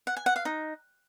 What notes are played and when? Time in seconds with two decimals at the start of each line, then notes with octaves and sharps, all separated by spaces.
0.07 F#5
0.17 G#5
0.26 F#5
0.36 F5
0.45 D#4